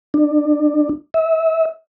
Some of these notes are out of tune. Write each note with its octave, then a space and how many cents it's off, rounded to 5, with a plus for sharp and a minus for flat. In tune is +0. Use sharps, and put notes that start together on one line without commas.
D4 +25
E5 -30